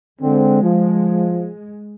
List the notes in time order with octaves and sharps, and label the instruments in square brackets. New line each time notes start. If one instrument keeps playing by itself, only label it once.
[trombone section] D3 C4 [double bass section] G#3
[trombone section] F3